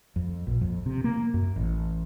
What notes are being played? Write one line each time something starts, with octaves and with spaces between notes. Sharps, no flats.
F2
A#1
F2
C3
A#3
F#2
A1